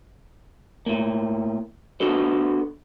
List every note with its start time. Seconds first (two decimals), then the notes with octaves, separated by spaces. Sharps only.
0.86 A2 A#3
2.00 B3 D4 F#4 A4 B4